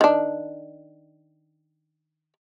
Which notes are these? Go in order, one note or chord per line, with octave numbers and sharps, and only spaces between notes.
D#3 D4